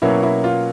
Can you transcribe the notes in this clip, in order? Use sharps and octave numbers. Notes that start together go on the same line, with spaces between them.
B2 F#3 A#3 C#4 E4
E4
F4